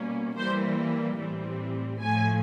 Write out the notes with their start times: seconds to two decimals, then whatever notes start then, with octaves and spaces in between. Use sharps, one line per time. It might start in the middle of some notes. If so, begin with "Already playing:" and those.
Already playing: B2 G3 A#3 C#4
0.35 E3 G3 A#3 C5
1.18 A2 E3 G3 C4
2.01 A2 F3 A3 G#5